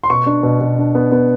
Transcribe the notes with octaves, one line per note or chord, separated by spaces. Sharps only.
C6
B2 C#6
D4
B2
B2
D4
B3
B3